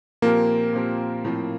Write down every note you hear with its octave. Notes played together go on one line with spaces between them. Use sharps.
A#2 F3 A#3 C4 G4 A#4
A#2 F3 C4 G4 A#4
A2 F3 C4